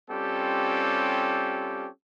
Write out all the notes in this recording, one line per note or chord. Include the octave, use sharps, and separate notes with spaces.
G3 C4 C#4 F4 G4 A4